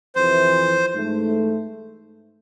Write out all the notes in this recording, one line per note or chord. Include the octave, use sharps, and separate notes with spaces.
F2 C3 E3 C5
G#2 E3 A3